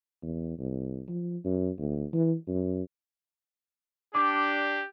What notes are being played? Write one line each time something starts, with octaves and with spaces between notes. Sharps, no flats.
E2
C2
F3
F#2
D2
E3
F#2
D4 G4 D6